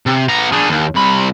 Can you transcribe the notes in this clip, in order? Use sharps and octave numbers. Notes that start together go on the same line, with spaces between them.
C3
B3 A#5
D4 G#4
D#2
C2 B5